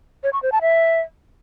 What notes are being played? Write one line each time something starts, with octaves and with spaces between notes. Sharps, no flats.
C#5
C#6
C5
A5
E5